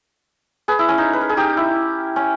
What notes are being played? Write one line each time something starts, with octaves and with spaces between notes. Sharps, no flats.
G#4 B4
E4
C#4
D#4
B4
A#4
G#4
D#4 G4
E4
C#4